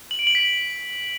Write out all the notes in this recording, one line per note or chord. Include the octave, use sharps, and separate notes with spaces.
F#7
D7
F#7
B6